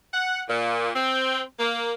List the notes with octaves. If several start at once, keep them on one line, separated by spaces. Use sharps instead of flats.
F#5
A#2
C4
A#3